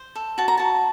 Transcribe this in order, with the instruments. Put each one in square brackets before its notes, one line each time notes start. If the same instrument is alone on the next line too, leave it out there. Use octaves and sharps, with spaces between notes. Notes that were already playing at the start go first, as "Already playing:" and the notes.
Already playing: [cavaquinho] C5
A4
F#4 A5
A#5
F#4 A5